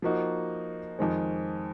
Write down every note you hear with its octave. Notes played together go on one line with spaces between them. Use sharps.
F3 A#3 D#4 F#4
F2 D#3 G#3